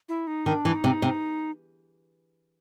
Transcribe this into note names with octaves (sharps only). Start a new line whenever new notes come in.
E4
D#4
D#3 D4
E3
D#4
C3
C3